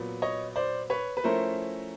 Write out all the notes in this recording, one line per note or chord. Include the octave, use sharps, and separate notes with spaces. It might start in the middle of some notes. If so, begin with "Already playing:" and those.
Already playing: A#2 F#3 B3
C#5 D#5
C5 D5
B4 C#5
B4
F3 A3 C#4 E4 A#4 C5